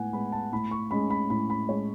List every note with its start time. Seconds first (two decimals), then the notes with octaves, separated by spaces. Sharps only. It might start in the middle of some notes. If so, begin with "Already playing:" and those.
Already playing: A2 G#3 B3 F#5 G#5
0.13 G#3 B3 B5
0.32 A5
0.52 A2 B5
0.71 C#6
0.91 G#3 C#4 B5
1.10 B5
1.30 A2 B5
1.50 B5
1.69 G#3 C#4 C#5